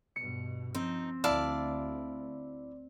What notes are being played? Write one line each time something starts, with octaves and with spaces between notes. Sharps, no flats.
G2 B2 C#7
F3 C4 D#4
D2 E4 D5 F5 A5